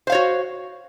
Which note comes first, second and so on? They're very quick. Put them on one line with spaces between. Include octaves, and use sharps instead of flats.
C5 F5 C#5 F#4